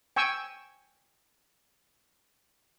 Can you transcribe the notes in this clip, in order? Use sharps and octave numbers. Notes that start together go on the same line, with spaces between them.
G5 G#5 C#6 E6